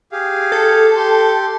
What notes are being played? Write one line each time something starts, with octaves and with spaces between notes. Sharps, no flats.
G4 G#4 F5
A4
G4 C6